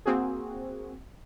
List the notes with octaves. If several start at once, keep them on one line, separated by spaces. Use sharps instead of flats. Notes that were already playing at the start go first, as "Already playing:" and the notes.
A#3 C4 F#4 G#4